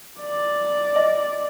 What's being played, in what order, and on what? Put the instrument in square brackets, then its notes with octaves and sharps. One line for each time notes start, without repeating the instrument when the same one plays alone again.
[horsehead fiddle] D5
[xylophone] D#5